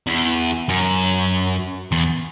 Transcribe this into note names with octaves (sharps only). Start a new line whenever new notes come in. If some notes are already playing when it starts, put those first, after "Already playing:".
E2
F#2
E2